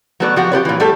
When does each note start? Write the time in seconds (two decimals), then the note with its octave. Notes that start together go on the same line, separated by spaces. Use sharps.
0.20 F#3 A3 B3 F#4 C#5 D5
0.36 F3 F#4 G4
0.51 F4 G4 B4 C#5
0.65 A#2 E3
0.80 G3 A3 G4 A4